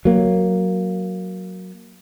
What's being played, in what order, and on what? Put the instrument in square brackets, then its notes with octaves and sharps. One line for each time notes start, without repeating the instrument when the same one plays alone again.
[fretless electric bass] F#3 A#3